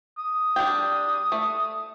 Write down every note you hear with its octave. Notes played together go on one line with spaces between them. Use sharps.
D#6
G3 D4 G5
A3